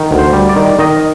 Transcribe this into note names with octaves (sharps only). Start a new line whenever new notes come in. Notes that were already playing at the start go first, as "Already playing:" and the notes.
Already playing: D#3
D2
C5
G3
D5
D#3
D#3 D#5